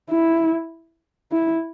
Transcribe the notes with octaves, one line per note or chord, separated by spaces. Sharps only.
E4
E4